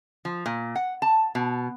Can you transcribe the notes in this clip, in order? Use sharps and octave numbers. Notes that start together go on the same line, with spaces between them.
F3
A#2
F#5
A5
B2